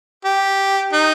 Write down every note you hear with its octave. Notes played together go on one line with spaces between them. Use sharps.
G4
D#4